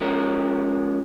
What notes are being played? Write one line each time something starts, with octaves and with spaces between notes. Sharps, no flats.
F3 G#3 C#4 A#4